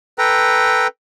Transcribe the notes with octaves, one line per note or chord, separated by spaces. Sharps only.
A4 B4 G5 A#5